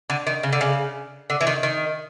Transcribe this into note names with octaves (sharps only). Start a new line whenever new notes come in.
D3
D#3
C#3
D3
C#3
D3
E3
D#3
D#3